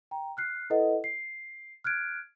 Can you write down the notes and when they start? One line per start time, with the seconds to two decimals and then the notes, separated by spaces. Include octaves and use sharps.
0.11 G5 A#5
0.37 F6 F#6 C7
0.70 E4 A4 B4 D#5 F#5
1.04 C7
1.84 F6 F#6 G#6 D7